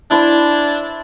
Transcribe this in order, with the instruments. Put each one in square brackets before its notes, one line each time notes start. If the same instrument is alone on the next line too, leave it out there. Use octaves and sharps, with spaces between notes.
[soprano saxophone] D4 [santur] E4 C5 A5